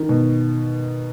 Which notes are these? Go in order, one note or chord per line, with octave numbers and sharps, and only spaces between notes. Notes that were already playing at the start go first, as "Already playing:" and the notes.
Already playing: D#3
B2